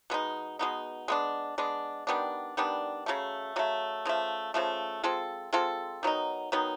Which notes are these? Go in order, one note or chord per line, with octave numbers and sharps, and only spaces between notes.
B2 G#3 B3 D#4
B2 G#3 B3 D#4
G#3 B3 D4
G#3 B3 D4
D#3 G3 B3 D4
D#3 G3 B3 D4
C#3 F#3 A3
C#3 F#3 A3
C#3 F3 A3
C#3 F3 A3
G#3 C4 F4 A4
G#3 C4 F4 A4
D#3 F#3 B3 D#4
D#3 F#3 B3 D#4